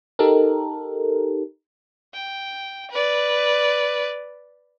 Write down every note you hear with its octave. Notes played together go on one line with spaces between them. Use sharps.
D#4 G4 A4 A#4
G5
B4 D5